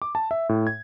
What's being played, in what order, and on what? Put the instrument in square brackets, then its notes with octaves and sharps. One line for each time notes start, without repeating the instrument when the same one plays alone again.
[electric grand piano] D6
A5
E5
A2
G#6